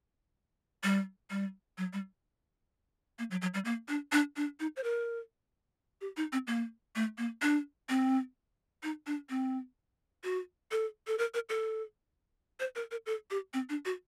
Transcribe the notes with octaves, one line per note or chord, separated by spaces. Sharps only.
G3
G3
F#3
G3
A#3
F#3
F#3
G3
A#3
D4
D4
D4
D#4
C5
A#4
G4
D#4
C4
A#3
A3
A#3
D4
C4
D#4
D4
C4
F#4
A4
A4
A#4
A#4
A4
C5
A#4
A#4
A4
G4
C4
D4
F#4